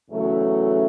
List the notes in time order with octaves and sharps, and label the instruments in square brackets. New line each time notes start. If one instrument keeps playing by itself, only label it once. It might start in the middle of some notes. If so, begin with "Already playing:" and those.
[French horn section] E2 C#3 F#3 A3